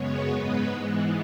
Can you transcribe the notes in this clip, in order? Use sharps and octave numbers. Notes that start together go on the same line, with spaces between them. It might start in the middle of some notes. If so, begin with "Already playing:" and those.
Already playing: F#2 C#3 G#3 B3 C#5
G#2 G#3 B3 B4
G#2 E3 G#3 B3